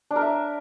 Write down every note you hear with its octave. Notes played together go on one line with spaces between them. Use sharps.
D4
A#4
E5